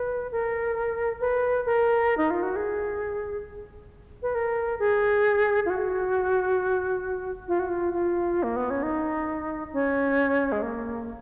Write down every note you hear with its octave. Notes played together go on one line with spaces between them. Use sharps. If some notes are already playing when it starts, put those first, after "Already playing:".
Already playing: B4
A#4
B4
A#4
D#4
F4
F#4
G#4
B4
A#4
G#4
F4
F#4
F4
F#4
F4
F4
A#3
B3
C#4
D#4
C#4
G#3
A#3